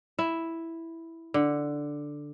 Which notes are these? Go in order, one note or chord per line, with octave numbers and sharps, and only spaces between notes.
E4
D3